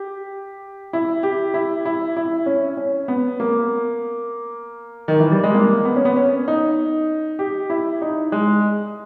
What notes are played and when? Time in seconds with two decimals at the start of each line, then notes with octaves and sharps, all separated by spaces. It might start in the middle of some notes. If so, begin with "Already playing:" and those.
Already playing: G4
0.93 E4
1.23 G4
1.54 E4
1.85 E4
2.17 E4
2.46 C#4
2.77 C#4
3.08 B3
3.40 A#3
5.08 D#3
5.20 E3
5.32 G3
5.43 G#3
5.54 A#3
5.85 B3
5.96 C#4
6.05 B3
6.17 C#4
6.48 D#4
7.39 G4
7.70 E4
8.02 D#4
8.32 G#3